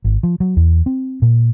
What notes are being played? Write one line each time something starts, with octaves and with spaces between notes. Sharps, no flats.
G#1
F3
F#3
E2
C4
A#2